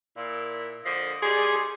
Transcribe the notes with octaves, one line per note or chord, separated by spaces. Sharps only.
A#2 E4
A#2 D3 F3 D#5
G3 D#4 G#4 D5 C6